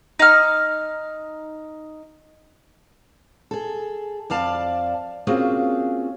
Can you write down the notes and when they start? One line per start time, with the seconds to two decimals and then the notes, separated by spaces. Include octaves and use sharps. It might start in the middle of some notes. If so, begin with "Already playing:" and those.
0.19 D#4 F6
3.51 G#4 A4
4.30 F2 D5 F5 A5
5.27 A#3 C4 C#4 F4 F#4 G#4